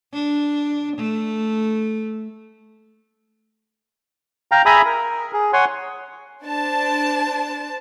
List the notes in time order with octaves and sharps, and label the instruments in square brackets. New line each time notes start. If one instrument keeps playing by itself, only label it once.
[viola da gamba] D4
A3
[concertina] F5 G5 A#5
G#4 E5 G#5 A#5 B5 D#6
A#4
G#4
C#5 F#5 G#5 C6
[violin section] D4 C5 A5